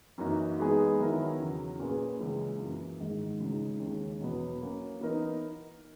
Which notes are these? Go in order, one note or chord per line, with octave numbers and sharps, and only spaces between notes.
F#2 E3 A#3 D#4 F#4
E3 G#3 B3 D#4 G#4
D#3 F#3 B3 E4 A#4
E2 C#3 F#3
A#2 A#3 C#4 G#4 B4
C#2 C#3 E3 G#3
F#2 E3 A#3
G#2 D#3 G#3
C#2 C#3 G#3 D#4
D#2 C#3 G#3
E2 B2 F#3 B3
F#3 A#3 C#4
E3 B3 D#4 A#4 D#5